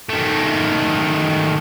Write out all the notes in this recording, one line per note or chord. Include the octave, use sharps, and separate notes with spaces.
D#3 A3